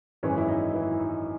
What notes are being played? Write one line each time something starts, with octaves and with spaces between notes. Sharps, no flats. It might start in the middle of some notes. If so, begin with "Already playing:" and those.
G#1 F#2 E3 G#3 C#4
E4
D#4
E3 E4
D#4